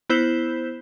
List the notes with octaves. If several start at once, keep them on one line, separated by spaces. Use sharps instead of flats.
B3 E4 C5 G6 E7